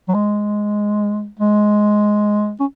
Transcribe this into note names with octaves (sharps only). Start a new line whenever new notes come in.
F#3
G#3
G#3
C#4